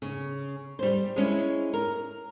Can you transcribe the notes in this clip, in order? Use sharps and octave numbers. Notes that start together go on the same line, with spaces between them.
C#3
G3 C5
G#3 C#4 E4
A#4